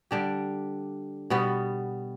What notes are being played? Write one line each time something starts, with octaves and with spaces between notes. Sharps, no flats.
D3 G3 D4 G4
B2 G3 B3